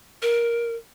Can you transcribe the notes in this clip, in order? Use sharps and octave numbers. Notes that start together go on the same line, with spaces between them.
A#4